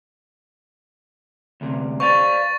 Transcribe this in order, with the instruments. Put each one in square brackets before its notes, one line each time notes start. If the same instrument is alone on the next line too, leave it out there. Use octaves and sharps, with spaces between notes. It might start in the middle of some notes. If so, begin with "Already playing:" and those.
[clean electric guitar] D2 C3
[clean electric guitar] C5 D5 F5 [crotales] C#6 A6